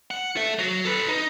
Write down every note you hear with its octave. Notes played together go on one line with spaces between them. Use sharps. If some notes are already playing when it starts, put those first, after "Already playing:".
F#5
A4 E5
F#3 F#4
A4 B4
D#4